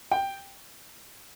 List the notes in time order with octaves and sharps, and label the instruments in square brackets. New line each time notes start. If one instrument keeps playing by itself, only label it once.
[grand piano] G5